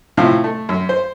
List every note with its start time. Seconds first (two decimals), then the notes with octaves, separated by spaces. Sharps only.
0.17 A2 C3 F3 F5
0.44 A3
0.69 F#2
0.89 C5